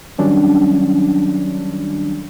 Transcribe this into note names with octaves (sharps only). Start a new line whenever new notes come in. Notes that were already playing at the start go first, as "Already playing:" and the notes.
D#3 F#3 G3 C#4 D4